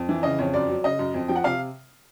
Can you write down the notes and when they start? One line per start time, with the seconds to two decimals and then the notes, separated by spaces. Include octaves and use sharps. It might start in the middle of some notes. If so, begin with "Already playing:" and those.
Already playing: F2
0.09 E3
0.23 C#3 D#5
0.39 F2 C#5
0.53 F#2 D5
0.68 F#3
0.84 C#3 D#5
0.99 F#2
1.14 F2
1.28 F3 G5
1.36 F#5
1.44 C3 F5